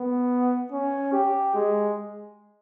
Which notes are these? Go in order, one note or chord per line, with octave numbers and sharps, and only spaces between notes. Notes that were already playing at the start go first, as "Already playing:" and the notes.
Already playing: B3
C#4
G4
G#3